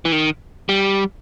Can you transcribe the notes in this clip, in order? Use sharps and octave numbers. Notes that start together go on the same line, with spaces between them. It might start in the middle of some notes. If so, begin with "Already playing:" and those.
E3
D#3
G3